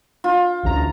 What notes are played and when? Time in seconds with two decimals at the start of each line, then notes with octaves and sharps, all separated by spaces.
0.24 F4
0.63 A1 D2 A#5